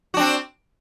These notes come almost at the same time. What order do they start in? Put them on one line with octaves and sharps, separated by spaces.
F#4 D4 C4